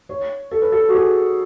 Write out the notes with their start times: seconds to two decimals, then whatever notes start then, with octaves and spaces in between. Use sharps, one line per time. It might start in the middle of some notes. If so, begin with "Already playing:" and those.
0.09 C#5
0.51 A4
0.62 B4
0.72 A4
0.89 F#4
0.95 G#4